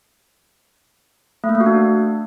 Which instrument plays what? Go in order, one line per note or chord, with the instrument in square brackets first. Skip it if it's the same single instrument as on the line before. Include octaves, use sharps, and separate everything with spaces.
[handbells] A3
A#3
A3
F#4
D4